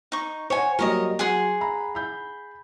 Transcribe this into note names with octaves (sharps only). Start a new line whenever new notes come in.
D#4 C#6
C5 C#5 F#5 G#5
F#3 G3 A#3 A#4 C#5 D#5
F#3 G#4 F#5 C6
A#5 B5
B5 G6